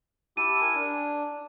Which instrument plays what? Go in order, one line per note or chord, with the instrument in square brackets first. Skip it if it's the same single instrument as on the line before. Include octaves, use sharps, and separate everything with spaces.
[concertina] E4 G4 A5 [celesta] D#7
[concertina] A#4 G#5
D4